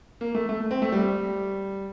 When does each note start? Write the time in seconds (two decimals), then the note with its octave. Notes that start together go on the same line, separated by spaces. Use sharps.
0.21 A#3
0.35 A3
0.49 A3
0.71 C4
0.82 A3
0.92 G3